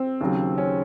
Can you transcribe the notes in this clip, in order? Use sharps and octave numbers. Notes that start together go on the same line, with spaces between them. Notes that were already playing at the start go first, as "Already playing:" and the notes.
Already playing: C4
D#2 C#3 F#3
C#4